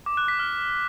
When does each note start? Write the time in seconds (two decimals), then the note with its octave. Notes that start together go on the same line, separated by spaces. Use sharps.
0.06 D6
0.17 F#6
0.28 B6
0.39 F6